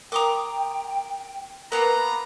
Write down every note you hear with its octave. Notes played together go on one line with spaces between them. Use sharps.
A#4 G5 A#5 C6 D6 D#6
A#3 B3 A#4 B4 A#5